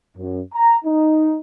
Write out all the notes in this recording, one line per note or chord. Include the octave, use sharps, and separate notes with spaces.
F#2
A#5
D#4